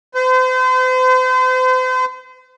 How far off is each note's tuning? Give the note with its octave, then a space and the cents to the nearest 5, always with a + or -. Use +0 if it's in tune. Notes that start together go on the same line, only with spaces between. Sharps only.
C5 -40